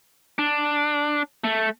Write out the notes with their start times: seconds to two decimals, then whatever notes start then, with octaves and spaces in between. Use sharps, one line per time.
0.39 D4
1.44 A3